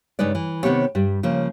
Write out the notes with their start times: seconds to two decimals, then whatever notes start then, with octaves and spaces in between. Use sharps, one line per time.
0.19 G2 C#3 G#3 D#4 B4 D5
0.35 E3
0.63 C3 D#3 B3 C4 G4 C#5
0.95 G2 G3
1.23 C#3 F3 A#3